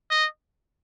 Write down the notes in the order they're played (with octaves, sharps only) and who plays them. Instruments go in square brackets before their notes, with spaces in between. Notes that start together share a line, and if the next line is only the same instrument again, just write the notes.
[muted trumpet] D#5